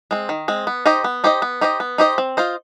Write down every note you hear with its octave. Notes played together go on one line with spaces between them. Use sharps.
G#3 C4
D#3
G#3 C4
B3
D#4 G4 C5 D#5
B3
D#4 G4 C5 D#5
B3
D#4 G4 C5 D#5
B3
D#4 G4 C5 D#5
C4
F4 C5 D#5